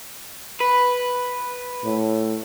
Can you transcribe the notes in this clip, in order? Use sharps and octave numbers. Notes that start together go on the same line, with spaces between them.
B4
A2